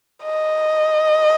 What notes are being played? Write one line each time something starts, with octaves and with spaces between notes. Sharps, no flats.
D#5